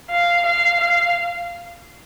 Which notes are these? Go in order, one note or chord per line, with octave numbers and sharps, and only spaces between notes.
F5
F5
F5